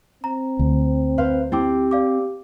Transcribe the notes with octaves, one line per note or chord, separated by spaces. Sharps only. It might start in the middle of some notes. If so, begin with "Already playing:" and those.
C4 A#5
D2
B4 C5 F5
C4 E4 G4 G5 D6
D5 F5 D6